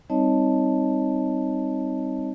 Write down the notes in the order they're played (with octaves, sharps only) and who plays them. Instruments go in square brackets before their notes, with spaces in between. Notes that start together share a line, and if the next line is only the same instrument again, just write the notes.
[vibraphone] G3 C4 D#4 C#5 D#5 A5